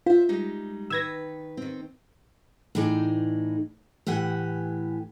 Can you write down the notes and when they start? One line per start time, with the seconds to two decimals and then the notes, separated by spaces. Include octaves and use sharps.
0.06 F4 C5 E5
0.29 G3 G#3 D#4
0.90 D#3 B4 E6 G#6 A#6
1.57 D#3 C4
2.75 A2 E3 D#4 G#4 D5
4.07 A2 E3 G4 F#5 G#5